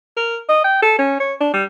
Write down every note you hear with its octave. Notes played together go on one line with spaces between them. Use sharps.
A#4
D#5
G5
A4
C#4
C#5
D4
G3